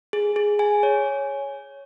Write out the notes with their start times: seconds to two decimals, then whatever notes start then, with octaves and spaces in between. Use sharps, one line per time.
0.13 G#4
0.36 G#4
0.59 G#5
0.83 C#5